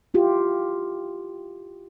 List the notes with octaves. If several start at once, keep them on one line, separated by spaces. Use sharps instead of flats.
E4 F4 G4